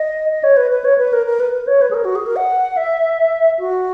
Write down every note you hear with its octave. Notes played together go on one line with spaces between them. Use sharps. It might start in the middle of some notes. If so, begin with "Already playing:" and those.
Already playing: D#5
D#5
C#5
B4
B4
C#5
B4
A#4
A#4
B4
B4
C#5
B4
G#4
A#4
F#4
G#4
A#4
F#5
E5
F#4